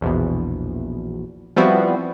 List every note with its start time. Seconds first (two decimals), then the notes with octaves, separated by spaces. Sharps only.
0.01 A#1 E2 B2
1.56 F3 G3 B3 C4 E4 F#4